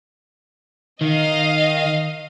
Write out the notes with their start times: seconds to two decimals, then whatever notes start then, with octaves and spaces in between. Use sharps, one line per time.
1.01 D#3 D#5 F5